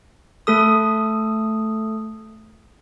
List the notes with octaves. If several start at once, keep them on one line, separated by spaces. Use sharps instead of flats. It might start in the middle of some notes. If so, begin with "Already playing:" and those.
A3 A4 D#6